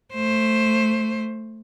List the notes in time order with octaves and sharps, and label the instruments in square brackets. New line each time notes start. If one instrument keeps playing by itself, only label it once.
[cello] A3 C5